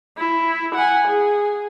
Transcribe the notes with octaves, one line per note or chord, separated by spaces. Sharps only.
E4
F#5 G#5
G#4